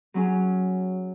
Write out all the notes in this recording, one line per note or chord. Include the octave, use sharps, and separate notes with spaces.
F#3 C#4 G#4